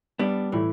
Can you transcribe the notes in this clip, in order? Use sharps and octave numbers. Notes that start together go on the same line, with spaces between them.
G3 B3 D4
A2 E3